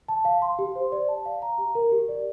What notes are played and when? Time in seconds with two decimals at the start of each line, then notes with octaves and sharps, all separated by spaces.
0.08 A5
0.25 F5
0.42 C6
0.59 G4
0.76 C5
0.92 D5
1.09 A5
1.25 F5
1.42 A#5
1.58 G4
1.75 A#4
1.92 G4
2.09 D5